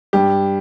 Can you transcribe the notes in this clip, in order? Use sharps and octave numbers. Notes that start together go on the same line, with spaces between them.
G2 G4